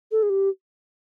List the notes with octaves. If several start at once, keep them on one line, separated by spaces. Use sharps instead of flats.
A4
G#4
G4